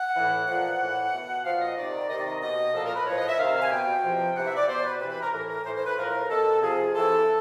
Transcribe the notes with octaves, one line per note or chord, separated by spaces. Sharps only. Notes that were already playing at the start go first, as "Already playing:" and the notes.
Already playing: F#5
A2 E3
A#2 F3 F#5
A2 E3
B2
A#2 F3 F5
D#5
C3 D#3 D5
C3 D#3 D#5
D5
D#5
B2 D#5
A#2 F3 A4
A#4
B4
A2 F3 C#5
D#5
E5
C3 D#3 F5
G#5
B2 G5
C3 F3
C3 E3 F#5
E5
D5
B2 C5
B4
C3 E3 B4
B4
A#4
A2 E3 A#4
A#4
A2 E3 C5
C5
B4
A2 F3 A#4
B2 A4
C3 F3 G#4
C3 E3 A4